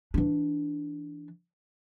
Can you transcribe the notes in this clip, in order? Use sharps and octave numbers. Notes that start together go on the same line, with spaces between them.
E3 D4